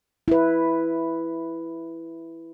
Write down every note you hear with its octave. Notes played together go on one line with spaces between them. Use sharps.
E4 B4